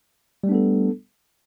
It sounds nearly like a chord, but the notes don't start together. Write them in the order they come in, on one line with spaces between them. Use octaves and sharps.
G3 A3 D4 B3 A4